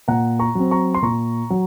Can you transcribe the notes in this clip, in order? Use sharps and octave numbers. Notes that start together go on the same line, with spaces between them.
A#2 F#5 A#5
A#5 C#6
F#3 C4
A#5 C#6
C6
A#2 A#5 C#6
F#3